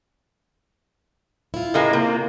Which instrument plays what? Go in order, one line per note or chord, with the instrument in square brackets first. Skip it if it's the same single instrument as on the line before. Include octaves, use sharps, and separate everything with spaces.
[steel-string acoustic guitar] E4 F4
[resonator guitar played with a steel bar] A2 G#3 A#3
[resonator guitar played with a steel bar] C3 [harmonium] A#3